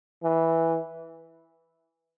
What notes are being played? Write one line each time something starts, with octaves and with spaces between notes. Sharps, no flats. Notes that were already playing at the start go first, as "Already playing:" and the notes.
E3